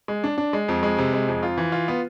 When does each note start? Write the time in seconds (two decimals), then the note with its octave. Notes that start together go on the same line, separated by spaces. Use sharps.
0.08 G#3
0.24 D4
0.38 D4
0.53 G#3
0.68 F2
0.83 G#3
0.98 C3
1.13 G#3
1.28 F2
1.43 F4
1.58 E3
1.72 F4
1.88 B3